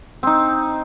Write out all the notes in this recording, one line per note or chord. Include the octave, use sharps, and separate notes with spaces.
C4 D#4